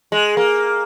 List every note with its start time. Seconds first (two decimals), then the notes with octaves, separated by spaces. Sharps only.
0.12 G#3
0.37 A#3